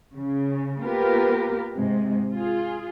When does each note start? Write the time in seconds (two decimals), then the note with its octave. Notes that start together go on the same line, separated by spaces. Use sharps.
0.15 C#3
0.81 A#3 B3 F4 G4 A#4 B4
1.74 G#2 C3 G#3
2.34 F4 G#4